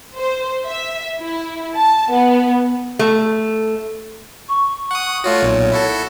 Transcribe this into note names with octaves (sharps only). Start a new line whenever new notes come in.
C5
E5
E4
A5
B3
A3
C#6
F#5 D#6
A3 F4 F#4 C#5
B1 A#2
E4 F#4 A4